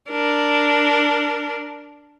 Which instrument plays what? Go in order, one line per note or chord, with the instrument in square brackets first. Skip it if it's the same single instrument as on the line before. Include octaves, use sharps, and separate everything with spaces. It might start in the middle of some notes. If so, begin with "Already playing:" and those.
[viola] D4 A#4